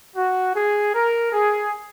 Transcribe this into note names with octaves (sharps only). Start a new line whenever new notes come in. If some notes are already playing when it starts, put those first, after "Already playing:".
F#4
G#4
A#4
G#4